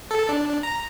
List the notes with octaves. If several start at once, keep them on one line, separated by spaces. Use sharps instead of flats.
A4
D4
A#5